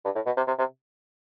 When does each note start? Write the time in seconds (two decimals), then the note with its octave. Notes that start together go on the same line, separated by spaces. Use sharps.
0.05 G2
0.15 A2
0.26 B2
0.37 C3
0.47 C3
0.58 C3